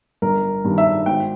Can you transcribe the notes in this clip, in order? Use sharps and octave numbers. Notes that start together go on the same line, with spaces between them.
G1 A#4
G2 D#3
E5
G#1 G5